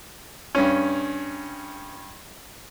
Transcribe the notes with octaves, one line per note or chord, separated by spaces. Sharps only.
G2 C#4